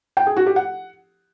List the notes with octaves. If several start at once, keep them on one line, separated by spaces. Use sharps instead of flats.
G5
G#4
F#4
G4
F#5